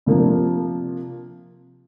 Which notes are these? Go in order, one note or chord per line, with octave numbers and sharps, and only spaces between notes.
C3 F3 A#3 D4